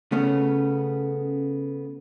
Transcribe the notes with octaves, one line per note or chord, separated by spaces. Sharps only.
C#3 A3 B3 C#4